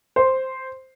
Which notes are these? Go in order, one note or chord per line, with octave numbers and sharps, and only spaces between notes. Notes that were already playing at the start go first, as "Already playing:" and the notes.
C5